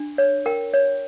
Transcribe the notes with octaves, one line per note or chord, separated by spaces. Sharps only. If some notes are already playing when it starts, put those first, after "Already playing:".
Already playing: D4
C#5
A#4 G5
C#5